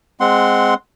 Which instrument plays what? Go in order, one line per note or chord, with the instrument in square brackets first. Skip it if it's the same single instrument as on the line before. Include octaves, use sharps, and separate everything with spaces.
[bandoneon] G#3 C4 F#5 C6